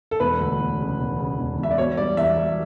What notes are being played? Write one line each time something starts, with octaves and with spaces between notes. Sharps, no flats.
A4
E1 B4
D2
E1
C#3
E1
C#3
E1
E1 E5
D5
B2 C#5
G3 D5
E2 E5
G3